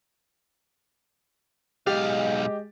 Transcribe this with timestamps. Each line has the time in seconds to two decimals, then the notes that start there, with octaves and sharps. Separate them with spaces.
1.87 B1 G#3 G4 D#5 F5 A6